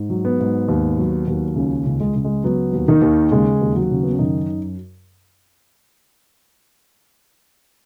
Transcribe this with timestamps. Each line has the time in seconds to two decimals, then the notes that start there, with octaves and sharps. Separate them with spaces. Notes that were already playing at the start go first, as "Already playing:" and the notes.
Already playing: G#2
0.10 F#3
0.25 B3
0.40 G#2
0.69 D#2
0.98 F#3
1.28 D#2
1.56 C#2 C#3 C#4
1.86 C#2
2.00 G#3
2.15 C#2
2.24 G#3
2.44 F#3 B3
2.73 D#2
2.88 D#3 D#4
3.02 D#2
3.31 C#3 G#3 G#4
3.62 D#2
3.76 F#3 F#4
3.91 C#3
4.03 B3
4.11 C#4
4.19 F#2 D#3 D#4